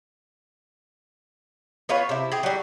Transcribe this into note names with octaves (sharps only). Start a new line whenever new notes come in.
B3 F4 B4 C#5
C3 E4
G4 G#4
F#3 G3